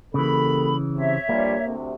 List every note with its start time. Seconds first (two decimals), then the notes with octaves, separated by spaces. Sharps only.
0.14 C#3 E3 A#3 G4 A4 B5
0.95 C3 C#5 E5
1.29 G2 F3 G3 A#3
1.65 D2 C3